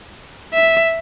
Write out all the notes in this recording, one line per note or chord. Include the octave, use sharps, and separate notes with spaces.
E5